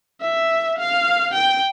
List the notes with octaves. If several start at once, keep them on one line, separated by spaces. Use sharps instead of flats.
E5
F5
G5